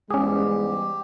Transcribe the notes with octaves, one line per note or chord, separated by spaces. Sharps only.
E2 G#2 G3 G#3 C#4 G4 G#4